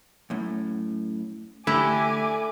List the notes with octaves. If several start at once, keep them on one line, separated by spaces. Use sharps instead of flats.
F#2 A2
D3 A3 E4 G4 G#5 D6